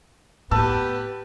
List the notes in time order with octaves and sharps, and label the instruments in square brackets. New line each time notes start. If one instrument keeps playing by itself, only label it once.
[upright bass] A2 [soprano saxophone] B3 [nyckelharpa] G4 B4 [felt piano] A5 E6